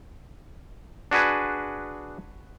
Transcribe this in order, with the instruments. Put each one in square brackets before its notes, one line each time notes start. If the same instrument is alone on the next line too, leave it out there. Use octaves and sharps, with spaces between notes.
[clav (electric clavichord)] D4 F#4 G#4 B4 G#5